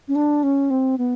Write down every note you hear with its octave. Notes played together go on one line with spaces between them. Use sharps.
C#4
D4
C#4
C4
B3